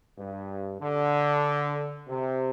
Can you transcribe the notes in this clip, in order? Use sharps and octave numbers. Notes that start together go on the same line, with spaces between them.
G2
D3
C3